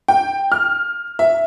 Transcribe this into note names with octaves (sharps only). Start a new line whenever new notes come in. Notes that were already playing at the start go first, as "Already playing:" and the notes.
G5
F6
E5